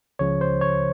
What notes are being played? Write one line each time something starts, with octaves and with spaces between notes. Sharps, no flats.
C#2 C#3 F3 C#5
C5
C#5